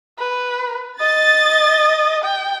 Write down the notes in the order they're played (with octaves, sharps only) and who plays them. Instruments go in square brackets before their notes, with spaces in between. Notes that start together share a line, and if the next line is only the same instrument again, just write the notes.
[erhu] B4
[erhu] D#5 [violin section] A6
[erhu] G5